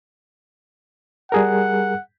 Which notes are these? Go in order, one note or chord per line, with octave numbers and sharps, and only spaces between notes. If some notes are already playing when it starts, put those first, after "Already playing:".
G3 G#4 A#4 F#5